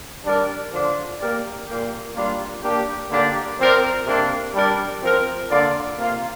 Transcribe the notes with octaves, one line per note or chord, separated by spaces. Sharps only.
G3 D4 A#4 D5
D3 F3 D4 F4
A#3 G4 A#4 D5
A#2 A#3 G4
G3 A#3 D4 F4
A#3 D4 G4
D3 A#3 D4 G4 D5
F3 C4 A#4 D5
C3 A#3 D4
G3 D4 A#4 D5
F3 C4 A#4
D3 A#3 F4 D5
C3 A#3 F4